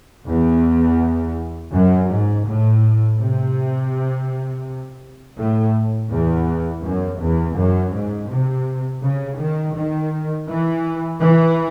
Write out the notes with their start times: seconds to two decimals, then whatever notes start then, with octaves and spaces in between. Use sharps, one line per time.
0.27 E2
1.73 F#2
2.10 G#2
2.47 A2
3.19 C3
5.38 A2
6.11 E2
6.83 F#2
7.20 E2
7.56 F#2
7.93 G#2
8.29 C3
9.03 C#3
9.39 D#3
9.75 D#3
10.49 E3
11.21 E3